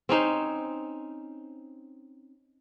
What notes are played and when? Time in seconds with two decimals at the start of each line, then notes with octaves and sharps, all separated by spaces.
0.09 C4 C#4 D#4 C5